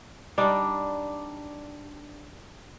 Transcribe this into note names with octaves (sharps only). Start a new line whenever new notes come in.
G3 D4 D#4